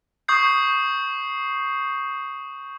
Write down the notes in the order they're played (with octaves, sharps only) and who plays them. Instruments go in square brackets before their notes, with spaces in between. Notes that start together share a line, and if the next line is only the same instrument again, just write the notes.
[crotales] C#6 D#6 G6 C7